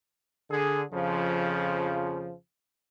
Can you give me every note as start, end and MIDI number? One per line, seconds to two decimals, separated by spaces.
0.50 0.82 50
0.50 0.82 68
0.92 2.32 41
0.92 2.32 49
0.92 2.32 53